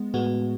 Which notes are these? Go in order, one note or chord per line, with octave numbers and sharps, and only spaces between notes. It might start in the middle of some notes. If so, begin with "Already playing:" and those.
Already playing: G#3 B3
A2 G#3 B3 F#4